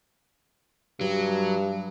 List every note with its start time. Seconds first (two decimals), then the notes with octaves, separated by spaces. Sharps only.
1.01 G2 F#3